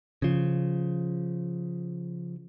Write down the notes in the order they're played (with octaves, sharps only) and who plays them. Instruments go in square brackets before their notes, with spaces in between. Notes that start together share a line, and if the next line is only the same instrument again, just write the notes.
[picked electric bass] C#3 F3